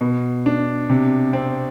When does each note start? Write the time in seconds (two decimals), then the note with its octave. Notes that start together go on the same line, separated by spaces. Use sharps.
0.01 B2
0.46 D4
0.90 C3
1.33 C4